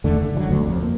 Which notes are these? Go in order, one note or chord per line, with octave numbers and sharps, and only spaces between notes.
E2 D3 A3
F#1
D3 E3 F#3
G1 D2
F2
A#3